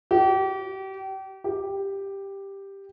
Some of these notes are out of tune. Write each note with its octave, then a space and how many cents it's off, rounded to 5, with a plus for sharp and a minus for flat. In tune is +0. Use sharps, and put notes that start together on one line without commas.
G4 -35
G4 +5